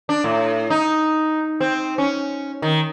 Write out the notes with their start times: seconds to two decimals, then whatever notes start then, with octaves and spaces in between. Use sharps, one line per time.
0.09 D4
0.24 A2
0.70 D#4
1.60 C4
1.98 C#4
2.62 D#3